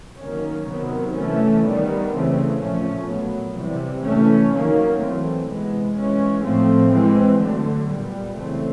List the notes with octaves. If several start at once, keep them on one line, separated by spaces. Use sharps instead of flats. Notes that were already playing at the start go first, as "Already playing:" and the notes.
D#3 F#3 A#3 C#4
C3 D#3 F#3 B3
E3 A3 C#4
D#3 G3 B3
C#3 E3 A3 C4
A#2 F3 A3 C#4
A#2 F#3 B3
C3 E3 G3
E3 A3 C#4
D#3 F#3 A#3 C#4
E3 A3 C4
C3 E3 G#3 B3
E3 G#3 C#4
A2 F3 A3 C4
E3 G#3 C4
D3 F#3 A3
A#2 G3 B3
C#3 E3 A3 C4